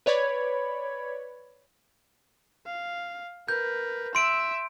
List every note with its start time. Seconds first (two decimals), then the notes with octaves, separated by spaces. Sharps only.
0.06 B4 C#5 D5 B5 G#6
2.66 F5
3.48 A#4 B4 G6
4.15 E5 C6 E6 D7